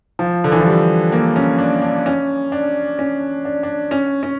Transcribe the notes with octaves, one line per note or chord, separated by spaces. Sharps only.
F3
D3
E3
F3
G3
A#3
C#4
D4
D4
C#4
D4
C#4
D4
D4
C#4
C#4